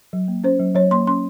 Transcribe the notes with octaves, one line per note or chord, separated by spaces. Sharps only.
F#3
A#3
C#4 C5
F#3
F#3 C#5
A#3 C6
C#4 C6